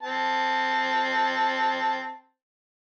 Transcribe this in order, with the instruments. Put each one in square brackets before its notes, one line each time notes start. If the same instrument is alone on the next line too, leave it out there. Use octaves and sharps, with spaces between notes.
[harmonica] C4 A5